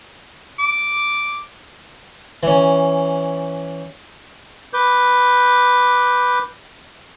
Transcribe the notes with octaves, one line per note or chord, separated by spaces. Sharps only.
D6
E3 C#4
B4 D6 G6